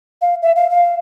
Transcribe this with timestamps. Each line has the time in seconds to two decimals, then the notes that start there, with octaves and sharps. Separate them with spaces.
0.22 F5
0.42 E5
0.56 F5
0.70 F5